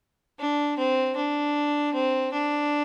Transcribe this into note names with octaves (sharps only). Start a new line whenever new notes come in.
D4
C4
D4
C4
D4